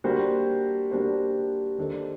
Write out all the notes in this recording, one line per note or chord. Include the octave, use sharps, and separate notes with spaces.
G3 A#3 D4 F#4 C5
G3 A#3 D4 F#4 C5
D#3 G3 D4 A4 C5